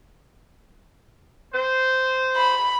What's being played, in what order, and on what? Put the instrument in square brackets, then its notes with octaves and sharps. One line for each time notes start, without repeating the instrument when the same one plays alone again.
[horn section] C5
[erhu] B5